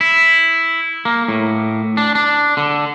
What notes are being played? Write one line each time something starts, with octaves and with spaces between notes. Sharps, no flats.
E4
A#3
A2
D4
D4
D3